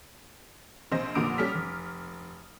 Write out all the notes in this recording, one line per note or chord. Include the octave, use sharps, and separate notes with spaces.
A#1 C3 C5 D#5 A#6
F1 A#2 D3 D6 D#6 D7
G3 C#4 A4 F6 B6
F1